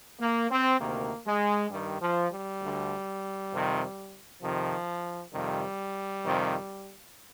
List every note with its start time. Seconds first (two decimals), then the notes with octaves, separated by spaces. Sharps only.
0.20 A#3
0.50 C4
0.79 D2 C3 D#3 A#3
1.26 G#3
1.70 G2 D#3 G3
2.01 F3
2.31 G3
2.62 D2 D3
3.52 F2 C3 D#3
4.41 F2 C3 D#3 F3
5.32 F2 C3 D#3 G3
6.24 F2 C3 D#3